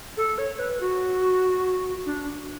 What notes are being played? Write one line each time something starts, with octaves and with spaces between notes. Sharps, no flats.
A4
C#5
B4
F#4
D4